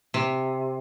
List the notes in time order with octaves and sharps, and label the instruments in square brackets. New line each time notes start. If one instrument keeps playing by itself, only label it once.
[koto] C3